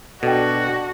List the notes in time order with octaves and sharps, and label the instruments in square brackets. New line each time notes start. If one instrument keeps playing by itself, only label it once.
[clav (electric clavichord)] B2 [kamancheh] D4 D5 [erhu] F#4 [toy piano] A4 D#5 G5